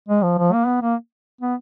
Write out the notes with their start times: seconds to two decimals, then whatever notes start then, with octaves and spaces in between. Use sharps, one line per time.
0.09 G#3
0.23 F3
0.38 F3
0.53 A#3
0.66 B3
0.82 A#3
1.41 B3